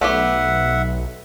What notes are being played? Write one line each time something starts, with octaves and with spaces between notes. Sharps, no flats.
B1 A3 B3 G4 E5 F#5